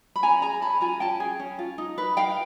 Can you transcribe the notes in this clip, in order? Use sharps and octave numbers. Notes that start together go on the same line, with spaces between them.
B5
C#4 G#5 A#5
G#4 G#5 A#5
C#4 A5 B5
F4 G#5 A#5
C#4 G5 A5
G#4
C#4
F4
D#4
B4
D#4 F5 G5